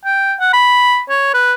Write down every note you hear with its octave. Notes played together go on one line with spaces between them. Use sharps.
G5
F#5
B5
C#5
B4